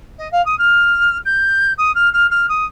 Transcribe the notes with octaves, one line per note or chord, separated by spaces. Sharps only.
D#5
F5
D#6
F6
G6
D#6
F6
F6
F6
D#6